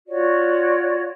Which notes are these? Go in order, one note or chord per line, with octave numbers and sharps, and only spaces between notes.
F4 F#4 C#5 D5